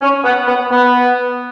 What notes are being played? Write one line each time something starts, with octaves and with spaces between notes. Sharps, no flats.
C#4
B3
B3
B3